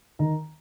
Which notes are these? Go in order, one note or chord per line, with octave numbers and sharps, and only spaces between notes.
D#3 A#5